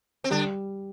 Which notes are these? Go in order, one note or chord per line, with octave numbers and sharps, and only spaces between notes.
C4
D3 G3 D4